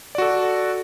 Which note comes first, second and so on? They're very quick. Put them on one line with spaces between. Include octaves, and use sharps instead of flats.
D5 F#4 A4